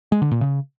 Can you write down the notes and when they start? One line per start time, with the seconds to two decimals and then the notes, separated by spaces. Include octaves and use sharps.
0.12 G#3
0.22 D3
0.31 A#2
0.41 C#3